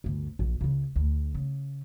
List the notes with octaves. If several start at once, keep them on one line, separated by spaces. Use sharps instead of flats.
G1 D2
A#1
C#2 C#3
D2
C#3